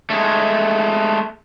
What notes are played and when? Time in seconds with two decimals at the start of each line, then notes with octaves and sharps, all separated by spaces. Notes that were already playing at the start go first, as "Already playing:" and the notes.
0.10 G#3 A3